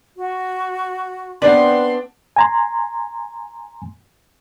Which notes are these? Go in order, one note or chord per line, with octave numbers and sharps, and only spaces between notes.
F#4
B3 C4 D4 B4 C6
G#5 A#5 C6